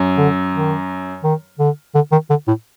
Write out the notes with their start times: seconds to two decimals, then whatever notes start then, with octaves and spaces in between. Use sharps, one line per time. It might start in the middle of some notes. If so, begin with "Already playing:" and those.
Already playing: F#2
0.17 D3
0.53 D#3
1.23 D#3
1.59 D3
1.95 D3
2.12 D#3
2.30 D3
2.48 A2